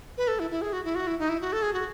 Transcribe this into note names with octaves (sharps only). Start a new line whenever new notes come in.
B4
A4
E4
E4
G#4
F#4
E4
F#4
E4
D#4
E4
F#4
A4
G#4
F#4